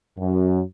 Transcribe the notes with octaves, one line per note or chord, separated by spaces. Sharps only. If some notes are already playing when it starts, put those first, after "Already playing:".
F#2